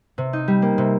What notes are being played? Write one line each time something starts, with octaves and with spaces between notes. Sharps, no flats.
C3
D#4
G3
A#3
C3